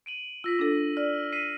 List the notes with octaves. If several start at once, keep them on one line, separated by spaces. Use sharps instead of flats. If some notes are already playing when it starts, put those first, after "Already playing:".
D7 D#7 F#7
F4 E6 A#6 B6
D4 A4
D5 F6
B6 C7 D#7